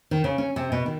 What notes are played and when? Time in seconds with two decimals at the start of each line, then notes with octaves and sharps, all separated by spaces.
0.11 D#3
0.24 C#3
0.38 C#4
0.56 C3
0.72 B2
0.86 D#3